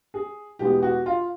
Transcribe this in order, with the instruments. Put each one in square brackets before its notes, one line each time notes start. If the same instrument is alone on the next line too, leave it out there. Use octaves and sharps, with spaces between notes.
[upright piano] G#4
E2 B2 G#3 B3 G4
F#4
F4